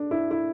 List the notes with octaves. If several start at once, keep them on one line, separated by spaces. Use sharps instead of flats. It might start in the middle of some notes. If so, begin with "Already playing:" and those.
Already playing: D4
E4
E4